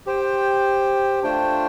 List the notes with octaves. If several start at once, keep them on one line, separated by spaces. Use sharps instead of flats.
G4 C5 G5
A3 D4 F4 C5 G5